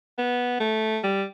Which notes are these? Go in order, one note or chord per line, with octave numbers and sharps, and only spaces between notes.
B3
A3
G3